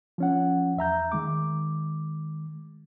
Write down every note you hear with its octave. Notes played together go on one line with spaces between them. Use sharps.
F3 C#4 F#5
E2 E5 A#5 G6
D#3 G#3 D6